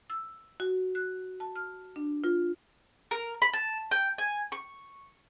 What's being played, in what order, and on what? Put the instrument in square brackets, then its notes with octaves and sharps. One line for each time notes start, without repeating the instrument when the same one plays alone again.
[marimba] E6
F#4
F#6
A5
F6
D4
F4
[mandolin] A#4
B5
A5
G5
G#5
C#6